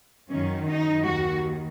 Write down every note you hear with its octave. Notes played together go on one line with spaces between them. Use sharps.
F#2 D#3 C#4
D#4
D#2 D#3 F#4